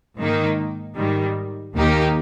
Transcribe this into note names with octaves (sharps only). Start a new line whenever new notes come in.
G#2 D#3 A#3 D#4
G#2 D#3 G3
D#2 D#3 A#3 D#4 G4